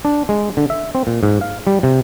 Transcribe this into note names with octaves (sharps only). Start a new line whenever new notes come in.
D4
G#3
D3
E5
C4
A#2
G#2
F5
G3
C3